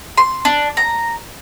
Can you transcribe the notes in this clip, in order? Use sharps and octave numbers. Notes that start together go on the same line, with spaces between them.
C6
D4
A#5